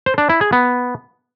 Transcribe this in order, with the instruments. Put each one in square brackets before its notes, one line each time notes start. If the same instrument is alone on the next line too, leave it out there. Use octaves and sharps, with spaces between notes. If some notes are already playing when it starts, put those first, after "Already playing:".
[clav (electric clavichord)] C5
D4
E4
G#4
B3